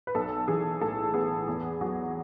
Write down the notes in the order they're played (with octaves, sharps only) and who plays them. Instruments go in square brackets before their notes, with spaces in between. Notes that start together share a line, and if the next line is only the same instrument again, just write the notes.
[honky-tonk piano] B4
B1 A4
E3 G#4
A2 A4
B3 G#4
E2
F#3